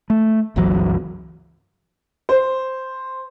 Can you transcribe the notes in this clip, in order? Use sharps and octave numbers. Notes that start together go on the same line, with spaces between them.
A3
G1 C#2 E3 F#3
C5